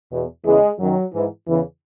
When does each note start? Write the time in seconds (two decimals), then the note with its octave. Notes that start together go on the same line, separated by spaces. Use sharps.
0.11 E2 B2
0.45 E2 C#3 E3 G#3
0.79 F#2 D#3 F#3
1.13 G#2 E3
1.47 E2 C#3 E3